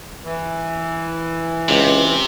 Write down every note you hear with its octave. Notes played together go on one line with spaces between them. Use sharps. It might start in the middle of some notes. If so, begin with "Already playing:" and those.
E3
C#2 C3